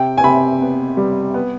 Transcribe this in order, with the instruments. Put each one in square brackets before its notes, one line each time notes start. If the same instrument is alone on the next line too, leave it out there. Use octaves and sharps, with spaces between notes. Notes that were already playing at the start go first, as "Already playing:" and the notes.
Already playing: [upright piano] C3 G5
G#5
C3 B5
B3
G3
B3